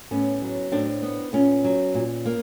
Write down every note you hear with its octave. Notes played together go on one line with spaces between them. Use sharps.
A2 B3 C#4
F#3
A2 C4 D4
B3
A#2 B3 C#4
F#3
A#2
A#3